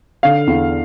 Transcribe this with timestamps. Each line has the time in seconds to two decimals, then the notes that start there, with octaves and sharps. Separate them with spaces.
0.23 D3 F5
0.47 E2